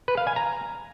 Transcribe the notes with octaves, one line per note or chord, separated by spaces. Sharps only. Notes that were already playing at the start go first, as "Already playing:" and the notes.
B4
F5
G#5
A#5